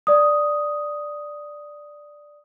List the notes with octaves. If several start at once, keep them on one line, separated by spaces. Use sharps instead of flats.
D5 D#6